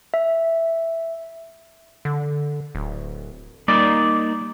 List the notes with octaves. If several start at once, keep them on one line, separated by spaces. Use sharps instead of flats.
E5
D3
D1
G3 A#3 D#4 D5